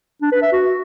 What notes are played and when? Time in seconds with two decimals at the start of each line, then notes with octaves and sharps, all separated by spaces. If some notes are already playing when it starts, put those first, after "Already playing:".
0.22 D4
0.32 B4
0.42 E5
0.52 F#4